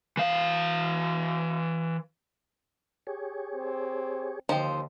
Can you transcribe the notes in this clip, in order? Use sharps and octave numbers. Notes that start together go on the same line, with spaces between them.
E3 F5
G4 G#4 C#5
C4
D#2 D3 F3 D#4 C5 G5